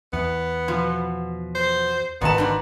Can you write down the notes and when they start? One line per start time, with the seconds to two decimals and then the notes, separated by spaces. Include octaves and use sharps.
0.13 E2 B3
0.68 B2 F3
1.55 C5
2.21 G#1 A#2 D#3 B3 A5
2.38 G#2 D4